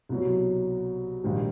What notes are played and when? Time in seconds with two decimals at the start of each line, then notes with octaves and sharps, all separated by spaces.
0.09 C2 B2 F#3
1.24 A#1 G#2 D#3 G3